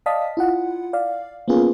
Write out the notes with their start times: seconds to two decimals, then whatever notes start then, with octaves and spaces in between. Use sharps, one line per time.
0.06 D5 D#5 F5 A5 D#6 B6
0.37 E4 F4 F#5
0.93 D5 F5
1.48 A#3 B3 C#4 F4 G#4